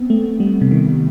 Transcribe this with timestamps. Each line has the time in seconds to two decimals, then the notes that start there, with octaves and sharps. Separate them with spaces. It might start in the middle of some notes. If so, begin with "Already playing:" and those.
Already playing: B3 C4
0.10 A3
0.40 G3
0.61 C3
0.71 D#3